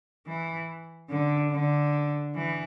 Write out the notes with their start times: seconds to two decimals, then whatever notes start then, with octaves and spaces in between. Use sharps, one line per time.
0.27 E3
1.10 D3
1.51 D3
2.35 E3